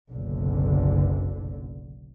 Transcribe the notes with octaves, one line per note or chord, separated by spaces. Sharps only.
F#1 B1 D3